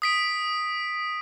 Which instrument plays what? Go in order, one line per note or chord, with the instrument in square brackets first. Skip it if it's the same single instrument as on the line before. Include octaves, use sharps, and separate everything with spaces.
[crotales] D#6 B6 D7